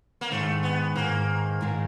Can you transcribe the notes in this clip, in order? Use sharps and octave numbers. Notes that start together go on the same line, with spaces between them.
A#3
G#2 D#3 G#3 A3
B3
G#2 D#3 G#3 A#3
G#2 D#3 G#3